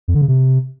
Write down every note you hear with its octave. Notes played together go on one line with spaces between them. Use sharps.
F2
D3
C#3
C3